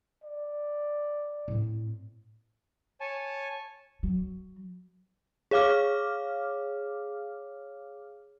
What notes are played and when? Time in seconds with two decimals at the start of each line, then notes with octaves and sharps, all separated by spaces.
0.24 D5
1.48 A2 C4
3.01 C#5 G#5 A5
4.03 F#3
5.51 G#4 C#5 F5 D6 F6